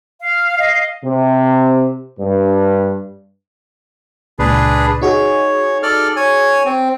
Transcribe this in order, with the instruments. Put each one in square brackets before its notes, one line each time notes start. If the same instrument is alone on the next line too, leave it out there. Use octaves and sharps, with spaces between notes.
[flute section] F5
D#5 F5
[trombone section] C3
G2
[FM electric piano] C#2 A#2 [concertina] D4 G#4 B4
[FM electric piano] D#4 F#4 G#4 [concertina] C#5
[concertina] A4 D5 F6
C#5 G#5
C4